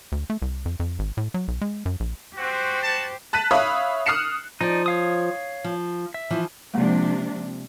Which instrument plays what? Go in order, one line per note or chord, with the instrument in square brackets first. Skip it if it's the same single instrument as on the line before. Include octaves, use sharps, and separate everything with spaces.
[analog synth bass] D2
A3
C2
F2
F2
G#1
A2
F#3
B1
G#3
F#2
A#1
[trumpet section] C4 F#4 [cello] G4 C5
[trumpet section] F#4 A5
[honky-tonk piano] A5 F#6 B6 D#7
C#5 E5 F5 B5 D#6
D#6 F6 F#6 C7 C#7 E7
[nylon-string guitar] F3 [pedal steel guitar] D#4 D5
[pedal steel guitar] C#5 F5 D#6
[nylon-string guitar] F3
[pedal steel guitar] E5
[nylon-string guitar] E3 F3
[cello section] C3 F3 D4 [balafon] G#3 A#3